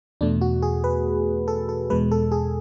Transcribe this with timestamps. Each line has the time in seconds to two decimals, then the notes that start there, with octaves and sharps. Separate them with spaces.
0.21 E2 B2 A3 D4
0.41 F#4
0.62 G#4
0.84 B4
1.48 A4
1.69 A4
1.90 E2 B2 G#3 B4
2.11 A4
2.32 G#4